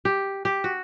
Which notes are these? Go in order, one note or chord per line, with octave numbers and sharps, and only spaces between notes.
G4
G4
F#4